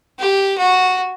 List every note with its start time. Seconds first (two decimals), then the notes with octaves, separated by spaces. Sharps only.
0.19 G4
0.58 F#4